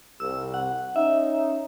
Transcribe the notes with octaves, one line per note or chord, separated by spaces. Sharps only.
C2 E6
F#5
C#4 D#4 E5